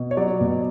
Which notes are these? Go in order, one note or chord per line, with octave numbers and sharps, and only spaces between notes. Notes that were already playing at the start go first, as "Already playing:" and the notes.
Already playing: B2
C#5
F#3 D5
B2